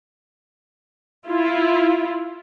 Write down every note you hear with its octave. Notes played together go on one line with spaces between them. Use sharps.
E4 F4